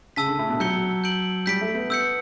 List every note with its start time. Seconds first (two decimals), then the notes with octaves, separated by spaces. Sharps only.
0.16 C#3 A5 E6 B6
0.28 D3
0.39 A2
0.49 B2
0.60 F#3 G6 C#7 G7
1.04 G6 D7 F#7
1.46 G3 G6 B6 D7
1.61 A3
1.75 B3
1.90 B3 E6 G6 C#7